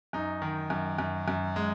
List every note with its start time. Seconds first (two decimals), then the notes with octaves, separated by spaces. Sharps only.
0.13 F#2 D#4
0.42 D#3
0.70 F#2
0.98 F#2
1.28 F#2
1.56 G#3